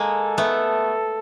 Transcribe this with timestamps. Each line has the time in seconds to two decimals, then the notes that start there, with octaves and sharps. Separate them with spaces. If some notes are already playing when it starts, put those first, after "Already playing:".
Already playing: G#3 A#3 A4
0.38 A3 B3